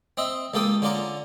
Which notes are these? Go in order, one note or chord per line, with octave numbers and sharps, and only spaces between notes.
C4 D#5 E5
C#2 A#3 A4 G5 D#6
D3 C#4 F4 D5 A#5